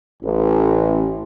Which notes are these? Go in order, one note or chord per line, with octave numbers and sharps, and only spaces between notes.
A1